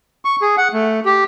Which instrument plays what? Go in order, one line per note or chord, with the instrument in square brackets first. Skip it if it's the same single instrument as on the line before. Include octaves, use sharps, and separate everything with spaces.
[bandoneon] C#6
G#4
F#5
A3
G4